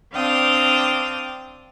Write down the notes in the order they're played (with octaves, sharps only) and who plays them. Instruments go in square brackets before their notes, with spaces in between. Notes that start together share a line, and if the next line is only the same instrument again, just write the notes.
[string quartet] C4 D4 F5 G5 D#6